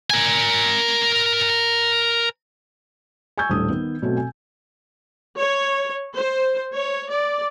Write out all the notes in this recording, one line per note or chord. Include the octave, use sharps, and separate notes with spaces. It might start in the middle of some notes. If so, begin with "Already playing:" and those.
A#4 G#5
G#5 C#6 E6 G6 G#6
D#1 A2 D4 D#6
D#3 B3
B2 F#3 A3 C4
G#5
C#5
C5
C#5
D5